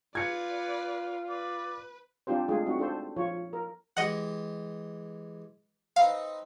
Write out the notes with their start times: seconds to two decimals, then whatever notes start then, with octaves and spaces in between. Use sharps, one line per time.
0.15 F4 B4 D5 G#6 C#7
1.29 B4 D5
2.27 G3 C4 D4 F4 G4 C5
2.48 G#3 A3 D4 F4 G#4
2.66 G3 C4 D#4 F#4
2.79 D4 A4 C5
3.17 F3 F4 C#5
3.53 A#4
3.97 E3 G#3 G4 D#5 F#5
5.96 C4 D#4 B4 F5